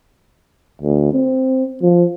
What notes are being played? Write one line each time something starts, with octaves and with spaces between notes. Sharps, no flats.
D2
C4
F3